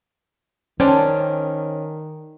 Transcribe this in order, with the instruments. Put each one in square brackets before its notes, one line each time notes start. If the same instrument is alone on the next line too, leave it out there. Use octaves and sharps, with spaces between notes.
[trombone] D#3 [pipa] G3 D4 [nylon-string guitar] C#4 [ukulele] C5 D5 G5